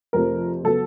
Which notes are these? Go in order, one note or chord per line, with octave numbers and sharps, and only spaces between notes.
F2 C3 F3 A3 C4 A#4
C#3 F#3 B3 A4